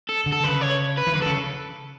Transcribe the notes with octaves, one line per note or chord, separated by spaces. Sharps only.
A4
D3
A4
C#3 B4
C#5
B4
E3
D3 B4
A4
C#3